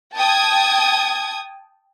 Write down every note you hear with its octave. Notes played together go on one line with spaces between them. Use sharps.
G5 A5 D#6 G#6